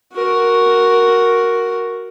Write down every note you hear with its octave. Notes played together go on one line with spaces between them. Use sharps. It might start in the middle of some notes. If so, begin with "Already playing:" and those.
F#4 A#4